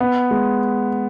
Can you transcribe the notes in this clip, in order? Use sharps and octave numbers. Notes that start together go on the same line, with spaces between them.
B3
G#3